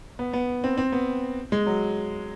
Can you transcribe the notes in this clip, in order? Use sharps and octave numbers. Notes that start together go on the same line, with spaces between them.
B3
B3
C4
C4
B3
G#3
F#3